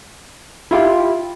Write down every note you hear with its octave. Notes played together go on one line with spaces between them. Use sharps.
E4 F4 G4